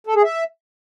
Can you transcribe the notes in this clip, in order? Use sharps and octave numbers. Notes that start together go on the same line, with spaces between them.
A4
G#4
E5